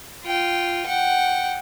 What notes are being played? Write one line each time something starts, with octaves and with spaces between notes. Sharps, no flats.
F4 G5
F#5 G5